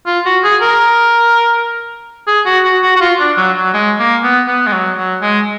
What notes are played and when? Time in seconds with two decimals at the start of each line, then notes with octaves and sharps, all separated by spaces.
0.06 F4
0.26 F#4
0.44 G#4
0.62 A#4
2.27 G#4
2.46 F#4
2.64 F#4
2.82 F#4
2.96 F#4
3.01 F4
3.20 D4
3.37 F#3
3.56 F#3
3.74 G#3
3.99 A#3
4.24 B3
4.48 B3
4.67 G#3
4.73 F#3
4.97 F#3
5.22 G#3